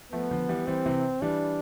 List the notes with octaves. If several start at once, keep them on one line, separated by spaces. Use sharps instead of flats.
F3 A3 B3
D3 F3
E3 G3
E3 G3 C4
C3 E3
E3 G3 D4